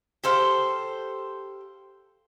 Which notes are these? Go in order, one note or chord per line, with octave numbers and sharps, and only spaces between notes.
G4 A4 C5 F5